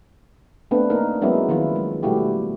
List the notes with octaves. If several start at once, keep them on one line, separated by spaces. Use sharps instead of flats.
A3 B3 C4 D4 B4
A#3 D#4 A#4
F#3 G#3 B3 C#4 E4
D#3 F3 B3 E4 F4
G#3
B2 G3 A3 E4 F#4 G4